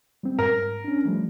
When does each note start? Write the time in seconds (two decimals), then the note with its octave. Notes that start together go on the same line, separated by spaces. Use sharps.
0.23 G3 C4
0.39 G#2 A#4
0.84 C#4 D4
1.05 F3 G3 A3